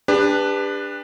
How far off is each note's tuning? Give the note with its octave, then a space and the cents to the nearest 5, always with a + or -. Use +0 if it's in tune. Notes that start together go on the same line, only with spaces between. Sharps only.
D4 +0 G4 +40 B4 +0